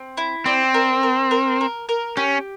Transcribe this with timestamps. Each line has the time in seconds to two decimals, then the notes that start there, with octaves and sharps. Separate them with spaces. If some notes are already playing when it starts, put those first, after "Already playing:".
Already playing: C4
0.17 E4
0.45 C4 D5
0.74 A#4
1.03 A#4
1.31 A#4
1.61 A#4
1.89 A#4
2.17 C#4 G4